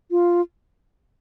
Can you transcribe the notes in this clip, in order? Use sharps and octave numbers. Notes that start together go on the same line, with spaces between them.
F4